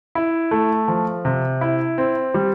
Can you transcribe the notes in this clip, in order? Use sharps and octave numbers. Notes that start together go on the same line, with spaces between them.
E4
A3
F3
C3
E4
C4
G3